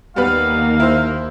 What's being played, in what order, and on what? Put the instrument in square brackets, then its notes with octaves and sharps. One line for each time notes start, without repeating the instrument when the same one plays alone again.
[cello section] D#2 A#3 [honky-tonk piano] G3 B3 B4 [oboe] F5
[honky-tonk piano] E4 C5